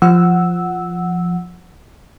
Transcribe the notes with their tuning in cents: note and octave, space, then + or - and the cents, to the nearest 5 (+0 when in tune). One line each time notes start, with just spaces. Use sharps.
F3 +0 F#5 +0 E6 -10